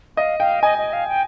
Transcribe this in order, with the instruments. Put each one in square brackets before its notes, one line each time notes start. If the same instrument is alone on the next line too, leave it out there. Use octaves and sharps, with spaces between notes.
[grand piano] D#5 [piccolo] F5
[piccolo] F5 [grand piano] G5
[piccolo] D#5 [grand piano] G#5
[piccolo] D#5
F5
G5